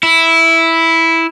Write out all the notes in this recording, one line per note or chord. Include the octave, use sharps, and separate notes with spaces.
E4